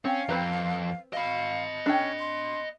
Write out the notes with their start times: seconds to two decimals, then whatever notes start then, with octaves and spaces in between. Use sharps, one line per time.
0.05 C4 C#4 F5
0.29 F2 C4 B4 A#5
1.13 D#5 F5 B5
1.86 C#4 D4 A4 G5
2.19 C6